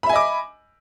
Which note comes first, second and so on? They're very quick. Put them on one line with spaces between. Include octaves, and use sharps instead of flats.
B5 E5 G#5 D#5 D6